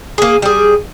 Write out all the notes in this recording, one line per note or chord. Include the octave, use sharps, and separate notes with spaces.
A#3 G#4
G3 G#4